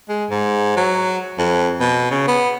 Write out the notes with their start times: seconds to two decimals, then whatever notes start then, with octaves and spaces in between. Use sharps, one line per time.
0.09 G#3
0.30 G#2
0.77 F#3
1.38 F2
1.80 B2
2.11 C#3
2.28 B3